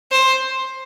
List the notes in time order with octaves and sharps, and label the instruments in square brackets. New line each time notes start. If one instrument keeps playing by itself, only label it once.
[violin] C5